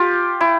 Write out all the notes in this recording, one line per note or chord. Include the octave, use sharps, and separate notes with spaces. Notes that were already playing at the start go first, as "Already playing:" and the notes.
Already playing: F4 G4
E4